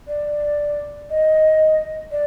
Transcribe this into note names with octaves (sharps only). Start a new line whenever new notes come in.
D5
D#5
D5